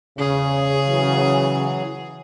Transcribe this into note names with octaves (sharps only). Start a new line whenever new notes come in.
E2 C#3 G#4
E3 F#3